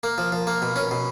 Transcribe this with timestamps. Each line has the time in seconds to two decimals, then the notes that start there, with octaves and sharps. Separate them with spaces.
0.03 A#3
0.18 F3
0.32 F3
0.47 A#3
0.62 B2
0.76 C#4
0.91 B2